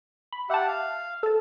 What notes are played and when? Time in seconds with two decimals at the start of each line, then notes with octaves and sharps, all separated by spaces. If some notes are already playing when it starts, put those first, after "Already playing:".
0.32 B5
0.50 G4 E5 F#5 A5
0.68 F5
1.23 A4 A5